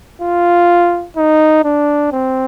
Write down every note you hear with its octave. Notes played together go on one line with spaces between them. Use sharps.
F4
D#4
D4
C4